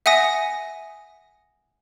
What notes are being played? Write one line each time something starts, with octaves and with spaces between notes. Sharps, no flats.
E5 F#5 G#5 D#6 A#6